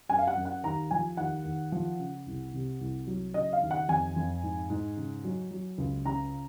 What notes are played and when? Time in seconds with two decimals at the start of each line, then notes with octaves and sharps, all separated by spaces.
0.09 F#2 G#5
0.18 F5
0.27 F#5
0.37 F#2
0.45 F#5
0.63 D#2 A#5
0.91 F3 G#5
1.17 D#2 F#5
1.45 D#2
1.72 F3
1.99 C#3
2.26 C2
2.53 C3
2.80 C2
3.07 F#3
3.34 C#3 D#5
3.53 F5
3.62 D#2
3.71 F#5
3.89 F2 G#5
4.16 F2
4.43 G#2
4.70 G#2
4.97 C#3
5.24 F#3
5.51 F#3
5.78 C#2
6.05 C#3 A#5